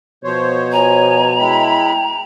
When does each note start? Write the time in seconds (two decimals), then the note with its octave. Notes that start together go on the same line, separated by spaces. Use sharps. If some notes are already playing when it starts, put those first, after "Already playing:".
0.24 B2 F3 C5 C#5
0.72 F3 C#5 G#5 A#5
1.39 G#3 E4 G5 B5